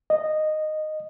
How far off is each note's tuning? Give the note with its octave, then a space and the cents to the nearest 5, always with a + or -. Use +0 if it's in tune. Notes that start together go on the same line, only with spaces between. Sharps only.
D#5 -10